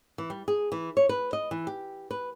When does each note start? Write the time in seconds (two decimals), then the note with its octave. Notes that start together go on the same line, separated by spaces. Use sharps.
0.18 E3
0.30 G3
0.48 G#4
0.72 E3
0.97 C#5
1.09 B4
1.33 D#5
1.51 E3
1.67 G4
2.11 B4